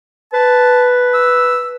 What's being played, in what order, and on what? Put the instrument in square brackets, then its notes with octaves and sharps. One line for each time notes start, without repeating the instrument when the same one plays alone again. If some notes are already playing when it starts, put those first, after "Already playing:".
[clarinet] B4 [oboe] A5
[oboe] E6